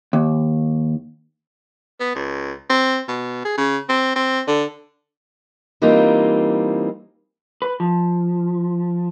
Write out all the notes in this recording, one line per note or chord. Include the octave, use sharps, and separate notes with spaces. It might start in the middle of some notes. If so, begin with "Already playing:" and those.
D#2
B3
C#2
C4
B2
G#4
C#3
C4
C4
D3
E3 G3 A#3 C4 D#4 F4
B4
F3